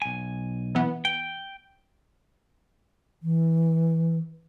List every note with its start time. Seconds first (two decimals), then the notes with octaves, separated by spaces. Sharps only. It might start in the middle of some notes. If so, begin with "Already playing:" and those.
0.02 B1 G#5
0.75 E3 B3
1.05 G5
3.23 E3